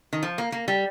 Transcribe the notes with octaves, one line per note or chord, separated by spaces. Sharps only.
D#3
F3
A#3
A#3
G3